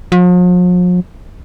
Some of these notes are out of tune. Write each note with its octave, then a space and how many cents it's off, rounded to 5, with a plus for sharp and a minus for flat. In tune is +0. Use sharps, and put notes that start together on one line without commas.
F3 +45